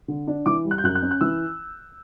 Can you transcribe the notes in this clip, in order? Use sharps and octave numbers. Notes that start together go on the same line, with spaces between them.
D3
D4
E3 D6
G3
F#6
G6
F#2 F#6
F#6
C#4
F#6
E3 E6